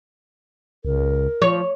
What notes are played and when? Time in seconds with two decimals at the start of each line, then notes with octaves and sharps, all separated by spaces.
0.85 C#2 A#4
1.42 F3 C#5